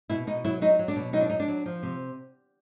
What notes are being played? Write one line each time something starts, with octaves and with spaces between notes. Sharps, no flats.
B2 E4
B2 D#4
F#3 E4
F#3 D#4
F#3
D4
B2
F#3 D#4
D4
F#3 D#4
D4
F#3
F3
C3